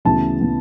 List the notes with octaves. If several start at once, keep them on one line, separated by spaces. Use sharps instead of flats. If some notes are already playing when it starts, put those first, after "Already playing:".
D2 C#3 E3 B3 A5
C#3 E3 B3